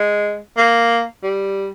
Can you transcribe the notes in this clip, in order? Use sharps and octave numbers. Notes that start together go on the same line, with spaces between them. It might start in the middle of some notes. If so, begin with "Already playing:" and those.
Already playing: G#3
A#3
G3